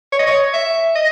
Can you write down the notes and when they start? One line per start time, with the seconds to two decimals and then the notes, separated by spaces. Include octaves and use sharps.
0.12 C#5
0.19 D#5
0.27 C#5
0.54 E5
0.96 D#5